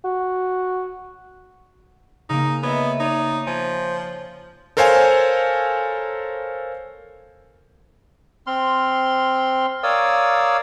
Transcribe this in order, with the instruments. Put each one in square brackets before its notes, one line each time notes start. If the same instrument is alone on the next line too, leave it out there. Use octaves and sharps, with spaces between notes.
[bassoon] F#4
[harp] C#3 A#3 [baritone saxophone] D#4
[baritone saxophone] B3 [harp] C#5 D#5 E5
[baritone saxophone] D#4 [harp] C#5 D5
[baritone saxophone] F3 [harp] G#5
[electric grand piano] A4 A#4 C5 C#5 F5 G#5
[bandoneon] C4 C6 F6
A#4 C#5 D5 F5 D#6 E6